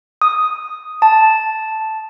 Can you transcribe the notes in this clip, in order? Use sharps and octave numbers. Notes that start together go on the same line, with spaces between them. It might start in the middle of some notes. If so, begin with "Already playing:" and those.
D#6
A5